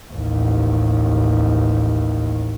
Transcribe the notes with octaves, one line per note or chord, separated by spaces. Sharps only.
A1 D#2